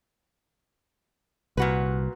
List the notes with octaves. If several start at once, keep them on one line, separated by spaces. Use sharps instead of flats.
C2 A#2 F#4 B4